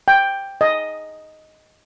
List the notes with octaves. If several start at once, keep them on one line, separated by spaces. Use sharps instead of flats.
G5
D#5